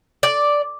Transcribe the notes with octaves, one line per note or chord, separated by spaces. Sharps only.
D5